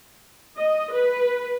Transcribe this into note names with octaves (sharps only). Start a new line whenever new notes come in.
D#5
B4